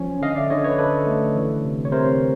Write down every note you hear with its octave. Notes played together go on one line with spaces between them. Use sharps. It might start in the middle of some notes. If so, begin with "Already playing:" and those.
Already playing: F3 C#4
D3 D#5 F5
D5 E5
D3 C#5 D#5
B4 C#5
D3 A4 B4
A3
E3
C3
C#5
C3 A#4 C5